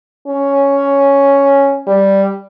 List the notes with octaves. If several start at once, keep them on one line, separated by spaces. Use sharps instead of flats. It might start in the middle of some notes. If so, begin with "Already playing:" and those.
C#4
G3